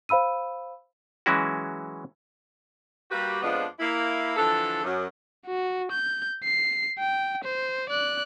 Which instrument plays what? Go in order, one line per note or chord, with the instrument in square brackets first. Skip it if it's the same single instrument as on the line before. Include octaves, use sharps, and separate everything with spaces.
[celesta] C5 F5 B5 E6 D#7
[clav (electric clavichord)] E3 F#3 G#3 C#4 E4 F#4
[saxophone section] G3 A#3 F#4 G4 B4
F2 F3 G#3 B3 D4
A#3 E4
D3 E3 F3 A4
F#2
[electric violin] F#4
G6
C7
G5
C5
D5 F#6